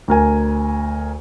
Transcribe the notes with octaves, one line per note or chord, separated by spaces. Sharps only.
D2 A#4 G#5